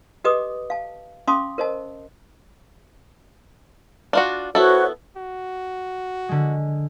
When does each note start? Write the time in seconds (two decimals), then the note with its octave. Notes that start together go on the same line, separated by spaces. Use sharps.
0.24 G4 A4 B4 D#5 D6 D#6
0.70 F5 A5
1.28 C#4 F5 A5 C6 D6 D#6
1.58 A#4 C5 D#5 A5
4.13 D4 F4 F#4
4.55 B3 E4 F#4 A4 C5 C#5
5.17 F#4
6.29 D3 G#3